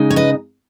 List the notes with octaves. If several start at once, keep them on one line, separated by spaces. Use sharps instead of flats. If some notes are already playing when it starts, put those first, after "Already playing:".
Already playing: C#3 G#3 D#4
C#5
B4 D#5